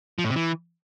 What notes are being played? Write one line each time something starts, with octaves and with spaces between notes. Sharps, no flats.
F3
A2
C3
E3